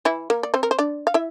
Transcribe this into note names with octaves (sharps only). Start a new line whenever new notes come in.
E3 E4
A#3 A#4
D5
C4 C5
A#4
C5
D4 D5
F5
E4 E5